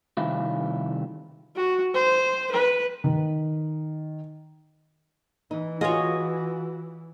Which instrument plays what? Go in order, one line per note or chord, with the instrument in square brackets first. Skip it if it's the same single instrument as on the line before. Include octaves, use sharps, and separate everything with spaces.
[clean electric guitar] C2 D#3 E4 F4
[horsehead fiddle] F#4
C5
B4
[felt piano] D#3
[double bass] E3 [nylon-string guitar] D#4
[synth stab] F4 [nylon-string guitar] F#4 G#4 [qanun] C#5 D#5